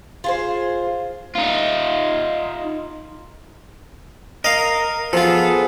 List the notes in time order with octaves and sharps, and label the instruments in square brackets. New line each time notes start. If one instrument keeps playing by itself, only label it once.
[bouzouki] F4 G#4 C5
[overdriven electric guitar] D#4 F4
[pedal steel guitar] A#4 [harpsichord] D#5 F5
[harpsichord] F3 F4 [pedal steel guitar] B3 G#4 A4